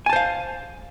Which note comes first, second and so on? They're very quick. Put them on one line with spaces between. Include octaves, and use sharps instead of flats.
G#5 A5 C5 F5